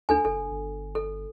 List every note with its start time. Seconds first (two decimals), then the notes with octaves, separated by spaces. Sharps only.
0.09 D2 D4 A4 G#5
0.25 F#1 A4
0.50 G1
0.95 A4